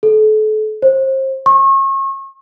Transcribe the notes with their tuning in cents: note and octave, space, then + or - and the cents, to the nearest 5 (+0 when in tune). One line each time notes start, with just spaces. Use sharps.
A4 -35
C5 +30
C#6 -35